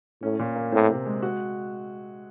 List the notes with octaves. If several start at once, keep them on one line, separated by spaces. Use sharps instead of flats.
A2 C#4
A#2
A#3
A2 C4
C3
G#3
F#4